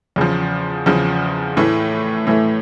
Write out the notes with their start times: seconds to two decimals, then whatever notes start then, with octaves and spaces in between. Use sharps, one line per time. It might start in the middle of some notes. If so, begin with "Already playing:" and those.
0.16 E2 C#3 F3
0.86 E2 C#3 F3
1.57 A2 E3 A3
2.27 A2 E3 A3